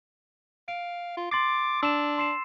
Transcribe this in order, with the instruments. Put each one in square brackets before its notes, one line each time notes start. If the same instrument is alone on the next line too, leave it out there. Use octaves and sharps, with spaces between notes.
[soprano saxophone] F5 [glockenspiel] D7
[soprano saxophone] F4
[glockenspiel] C6 A6 C7 [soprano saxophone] D6
[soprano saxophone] D4 [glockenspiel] E6 E7
[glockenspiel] C6 C7 E7